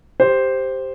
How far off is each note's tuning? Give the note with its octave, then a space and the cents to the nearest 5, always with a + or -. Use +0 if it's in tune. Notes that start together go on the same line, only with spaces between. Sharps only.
G4 +0 C5 +0